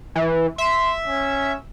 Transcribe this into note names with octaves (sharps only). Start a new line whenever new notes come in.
E3
E5 C6
C#4